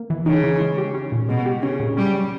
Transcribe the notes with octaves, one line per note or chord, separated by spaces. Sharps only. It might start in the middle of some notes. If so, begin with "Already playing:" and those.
Already playing: A#3
E3
C#3 D#4
E3
G#3
G4
C#4
A#2
B2 G#3
G4
C#3 C#4
A#2
G3 C#4
G3